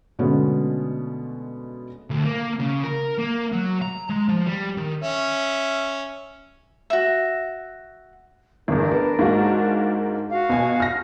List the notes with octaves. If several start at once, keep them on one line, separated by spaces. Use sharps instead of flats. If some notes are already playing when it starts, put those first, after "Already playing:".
B2 D3 G#3 A3 B3 C#4
D2
A#3
C#3
A#4
A#3
F#3
A#5
G#3
F3
G3
D#3
C#4 E5
F#4 E5
G1 E2 D4 A#4
B3
G#2 A#3 F#4
F#4 F5
B2 G#5
F6 A#6